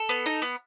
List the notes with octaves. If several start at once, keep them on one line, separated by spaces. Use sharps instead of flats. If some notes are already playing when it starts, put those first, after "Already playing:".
Already playing: A4
B3
D#4
B3